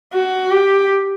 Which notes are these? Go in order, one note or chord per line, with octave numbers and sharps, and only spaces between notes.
F#4
G4